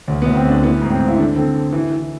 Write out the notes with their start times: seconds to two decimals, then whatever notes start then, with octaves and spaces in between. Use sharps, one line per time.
0.08 D2
0.22 B3
0.26 D2
0.35 C4
0.44 D2
0.49 D4
0.62 E3 B3
0.82 G#2
0.90 C4
0.99 G#2
1.08 E4
1.17 D3 D4
1.36 D3 C4
1.54 D3
1.73 E3
1.91 E3